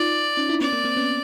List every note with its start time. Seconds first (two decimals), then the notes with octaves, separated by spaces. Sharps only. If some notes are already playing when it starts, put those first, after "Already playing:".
Already playing: D#4 F4 D5
0.37 C#4 D#4
0.49 D4 E4
0.61 B3 C#4 D5
0.72 A#3 C4
0.84 A#3 C4
0.96 B3 C#4